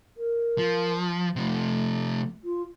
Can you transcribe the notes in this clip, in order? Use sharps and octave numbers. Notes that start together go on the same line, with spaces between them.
A#4
F3
C3 F3 A3
F4